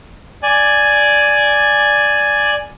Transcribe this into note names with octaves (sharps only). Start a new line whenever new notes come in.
D5 G#5